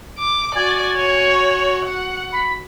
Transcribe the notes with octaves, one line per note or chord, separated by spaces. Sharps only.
D6
F#4 D5 G#5
C#5
F#5
B5